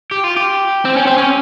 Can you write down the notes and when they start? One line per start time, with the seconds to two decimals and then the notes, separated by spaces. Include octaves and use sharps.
0.11 G4
0.24 F4
0.36 G4
0.85 C4
0.96 C#4
1.06 C4
1.18 C#4